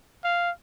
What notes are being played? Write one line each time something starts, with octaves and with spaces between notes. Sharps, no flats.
F5